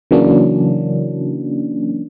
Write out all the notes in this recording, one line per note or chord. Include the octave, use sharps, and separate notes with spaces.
C#3 E3 F#3 A#3 C#4 D4